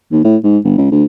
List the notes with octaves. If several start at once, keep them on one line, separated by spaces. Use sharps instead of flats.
D#2
A2
G#2
G1
C#2
D2